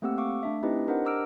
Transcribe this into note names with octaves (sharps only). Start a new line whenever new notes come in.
A3 A#3 C4 G4 F#5 E6
F5 C#6 D6
A3 D4 E5
C4 D#4 E4 G4 B4 D#5
D4 G4 A#4 C5 D#5 F#5
A#5 D6 E6 F6 D7